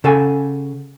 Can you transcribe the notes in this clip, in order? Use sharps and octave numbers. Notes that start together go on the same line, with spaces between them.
C#3 A4 F#5 G#5